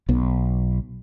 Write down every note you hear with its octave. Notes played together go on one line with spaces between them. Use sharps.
B1 B3